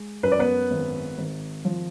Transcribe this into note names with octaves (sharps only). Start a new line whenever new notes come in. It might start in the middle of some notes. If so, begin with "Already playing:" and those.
Already playing: G#3
F#2 B4
D5
B3 B4
G#1
G#1
F3